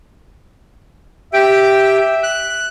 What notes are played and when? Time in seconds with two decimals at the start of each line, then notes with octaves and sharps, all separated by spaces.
1.34 G4 E5 G5
2.23 F#6